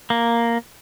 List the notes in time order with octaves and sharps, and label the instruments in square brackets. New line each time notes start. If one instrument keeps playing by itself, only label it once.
[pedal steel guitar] A#3